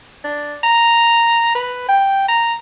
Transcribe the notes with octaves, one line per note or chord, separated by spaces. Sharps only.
D4
A#5
B4
G5
A#5